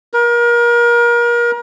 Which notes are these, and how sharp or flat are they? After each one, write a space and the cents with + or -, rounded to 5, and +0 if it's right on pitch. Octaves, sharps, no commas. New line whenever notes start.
A#4 +30